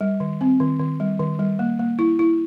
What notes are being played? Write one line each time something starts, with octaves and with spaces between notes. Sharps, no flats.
G3
D#3
C4
D#3
D#3
G3
D#3
G3
A#3
A#3
E4
E4